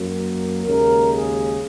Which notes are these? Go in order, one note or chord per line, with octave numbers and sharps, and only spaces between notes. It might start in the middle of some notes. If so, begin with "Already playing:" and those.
Already playing: F#2 F#3 A#3
D#2 C#3 G#3 A#4
G#4